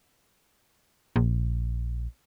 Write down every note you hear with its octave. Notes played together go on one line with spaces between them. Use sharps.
A#1